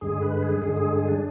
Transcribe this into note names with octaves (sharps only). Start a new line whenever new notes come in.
G2 D3 G#3 G#4
B4
G#4
G2 D3 G#3 G#4
G#4
G#4
D4